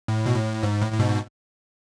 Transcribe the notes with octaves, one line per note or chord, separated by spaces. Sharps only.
A2
B2
A2
G#2
A2
A2
G#2 B2